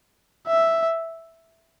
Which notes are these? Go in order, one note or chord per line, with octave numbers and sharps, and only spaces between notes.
E5